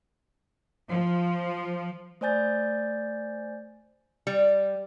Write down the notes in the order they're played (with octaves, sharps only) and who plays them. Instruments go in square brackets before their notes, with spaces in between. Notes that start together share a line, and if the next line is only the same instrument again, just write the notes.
[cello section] F3
[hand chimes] A3 C5 D5 G#5 G6 A6
[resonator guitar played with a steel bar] G3